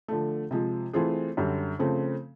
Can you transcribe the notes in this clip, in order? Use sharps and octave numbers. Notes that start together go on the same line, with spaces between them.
D3 F3 A3
C3 F3 G#3
E3 A3 C4 F4 G#4
F#2 D3 G3
C#3 F3 A3 C4